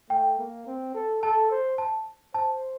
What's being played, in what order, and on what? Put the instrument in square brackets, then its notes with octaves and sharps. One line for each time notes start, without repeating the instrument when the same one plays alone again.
[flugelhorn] A3 [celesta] G5
[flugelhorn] A#3
C4
A4
[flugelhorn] A4 [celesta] A5
[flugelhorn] C5
[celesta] A5
[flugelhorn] C5 [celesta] A5